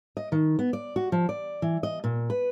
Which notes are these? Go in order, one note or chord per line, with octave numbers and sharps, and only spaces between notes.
D#5
D#3
B3
D5
F#4
F3
D5
E3
D#5
A#2
B4